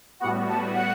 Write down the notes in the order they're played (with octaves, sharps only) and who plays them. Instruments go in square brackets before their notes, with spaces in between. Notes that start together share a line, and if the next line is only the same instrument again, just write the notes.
[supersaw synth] A2 G3 B3 F#4 [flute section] F#5
[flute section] A5
F#5